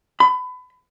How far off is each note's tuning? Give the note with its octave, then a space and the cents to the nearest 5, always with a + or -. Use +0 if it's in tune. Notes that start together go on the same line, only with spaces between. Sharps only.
B5 +30